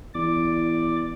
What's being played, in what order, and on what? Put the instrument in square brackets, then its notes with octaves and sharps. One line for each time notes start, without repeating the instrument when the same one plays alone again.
[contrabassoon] E2 [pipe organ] D5 D6